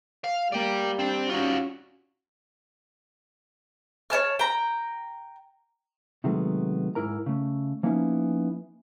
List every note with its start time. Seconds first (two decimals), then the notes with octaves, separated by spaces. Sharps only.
0.24 F5
0.52 G3 A#3 D5 G5
0.99 C4 D4
1.30 C#4 D#4 F4 F#4
4.10 C#5 D5 A5 F6
4.39 G5 A#5
6.24 C3 D#3 F#3 G#3 A3 B3
6.95 G#2 C3 E4 A#4 A#5
7.26 C#3 A3
7.83 F3 A#3 B3 C#4 D#4 E4